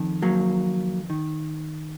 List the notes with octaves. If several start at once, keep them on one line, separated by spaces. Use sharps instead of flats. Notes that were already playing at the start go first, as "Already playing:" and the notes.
Already playing: F2 D#3
F#3 A#3
D#3